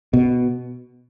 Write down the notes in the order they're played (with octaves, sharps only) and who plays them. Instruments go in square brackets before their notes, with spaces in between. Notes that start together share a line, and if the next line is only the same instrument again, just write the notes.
[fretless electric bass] B2